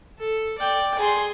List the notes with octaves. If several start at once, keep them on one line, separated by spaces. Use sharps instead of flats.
A4
D5 G5
G#4 C6